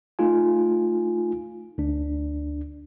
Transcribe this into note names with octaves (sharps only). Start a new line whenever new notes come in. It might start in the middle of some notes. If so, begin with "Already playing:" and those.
A3 D#4 F4 G#5
D2 D4